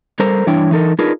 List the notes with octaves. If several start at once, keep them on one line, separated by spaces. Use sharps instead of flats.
G3 A4 A#4 C5 A#5
G2 E3 D4 E4 C#5 G5
E3 D#4 A4 A#4
D4 D#4 F4 G#4 A#4 B4